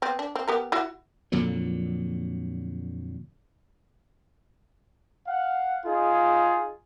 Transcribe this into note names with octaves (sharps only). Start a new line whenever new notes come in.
B3 C4
D4
C4
B3 G4 A#4
E4 F#4
F2 A#2 D3 F#3
F5 F#5
D#4 F4 G#4